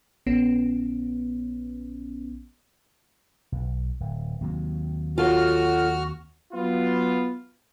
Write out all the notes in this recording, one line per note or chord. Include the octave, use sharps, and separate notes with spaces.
A#1 B3 C#4
B1
D1
D#2 C3 F#3
F4 F#4 A4 C#5 F6
F#3 B3 F4